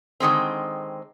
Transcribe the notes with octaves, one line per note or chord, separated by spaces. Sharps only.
D3 D#3 G#3 C4